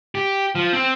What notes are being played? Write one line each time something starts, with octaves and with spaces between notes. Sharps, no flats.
G4
F3
C4